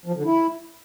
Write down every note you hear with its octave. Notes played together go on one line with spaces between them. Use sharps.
F3
D3
E4